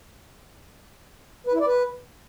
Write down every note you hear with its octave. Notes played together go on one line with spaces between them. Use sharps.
B4
E4
D5
B4